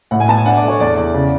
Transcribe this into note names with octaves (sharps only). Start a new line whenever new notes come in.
A2 F#5
G#5
B3 A5
G#5
D4 F#5
D5
A3 C#5
E2 D5
E2
C#3